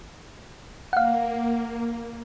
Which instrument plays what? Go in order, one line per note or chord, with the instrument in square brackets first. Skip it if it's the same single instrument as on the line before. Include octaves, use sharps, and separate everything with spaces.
[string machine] A#3 [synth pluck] F5 F#5